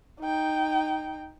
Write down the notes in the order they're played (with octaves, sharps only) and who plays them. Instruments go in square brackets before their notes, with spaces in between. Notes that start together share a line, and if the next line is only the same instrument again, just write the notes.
[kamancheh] D#4 G5